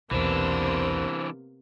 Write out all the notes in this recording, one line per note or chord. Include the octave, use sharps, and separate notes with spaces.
B1 E2 C3 E3 A#3 B3 D4 C5